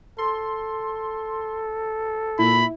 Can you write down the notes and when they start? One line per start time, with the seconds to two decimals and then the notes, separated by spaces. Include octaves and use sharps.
0.18 A4 C6
2.39 A#2 E4 B5